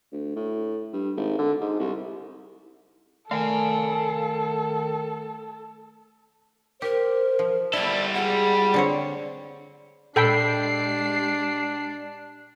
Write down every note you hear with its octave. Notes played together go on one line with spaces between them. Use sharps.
D2
A2
G2
G#1
D3
G#2
C2
D#3 A3 A4 F5 G5 G#5
G4 A#4 C5
F3
G3 E4 A4 D5
G#3 F4 G#4 F#5
D3 C4 C#5
A#2 G#3 D4 G4 A4 G5 B5 C7